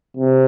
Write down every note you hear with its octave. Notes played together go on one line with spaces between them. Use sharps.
C3